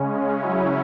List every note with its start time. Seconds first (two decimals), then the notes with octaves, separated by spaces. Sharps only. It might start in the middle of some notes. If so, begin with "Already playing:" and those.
Already playing: C#3 G#3 C#4
0.41 C#3 F#3 C#4 E4